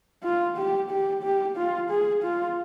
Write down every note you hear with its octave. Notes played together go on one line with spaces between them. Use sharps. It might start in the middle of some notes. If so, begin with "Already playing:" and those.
F4
G4
G4
G4
F4
G#4
F4